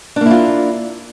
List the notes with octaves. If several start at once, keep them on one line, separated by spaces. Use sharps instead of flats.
A#3 D4 E4 F4